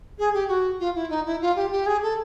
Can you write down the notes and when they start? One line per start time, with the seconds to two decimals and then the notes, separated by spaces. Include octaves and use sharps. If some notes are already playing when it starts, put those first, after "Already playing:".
0.18 G#4
0.34 G4
0.48 F#4
0.79 F4
0.95 E4
1.09 D#4
1.25 E4
1.41 F4
1.56 G4
1.72 G4
1.86 G#4
2.02 A4